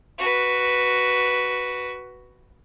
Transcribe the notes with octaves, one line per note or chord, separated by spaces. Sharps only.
F#4 B4